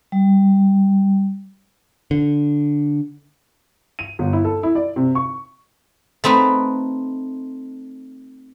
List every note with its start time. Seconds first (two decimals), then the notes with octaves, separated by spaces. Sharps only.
0.12 G3
2.11 D3
3.99 D#7
4.19 G1
4.33 E4
4.45 A4
4.63 E4
4.75 D5
4.96 C3
5.15 C#6
6.24 A3 C4 D#4 B4